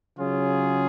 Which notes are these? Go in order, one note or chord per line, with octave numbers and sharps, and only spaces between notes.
C#3 F#3 C#4 F4 G#4